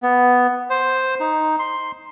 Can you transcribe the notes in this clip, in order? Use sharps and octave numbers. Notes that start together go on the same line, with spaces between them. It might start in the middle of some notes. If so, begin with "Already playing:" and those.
B3
C5
D#4
C6